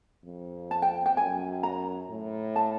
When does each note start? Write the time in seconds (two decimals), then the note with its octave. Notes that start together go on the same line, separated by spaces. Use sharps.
0.25 F2
0.71 A5
0.82 G5
1.06 G5
1.17 F#2 G#5
1.63 A#5
2.09 A2
2.56 A5